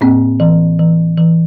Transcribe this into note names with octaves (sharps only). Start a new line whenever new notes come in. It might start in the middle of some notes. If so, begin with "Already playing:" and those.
A2 A#3 C4
E3
E3
E3